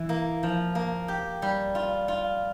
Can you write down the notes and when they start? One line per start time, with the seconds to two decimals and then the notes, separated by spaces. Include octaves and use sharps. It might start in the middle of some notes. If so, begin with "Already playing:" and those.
Already playing: E3
0.09 A#3
0.43 F3
0.75 A#3
1.08 G4
1.42 G3
1.75 F4
2.08 F4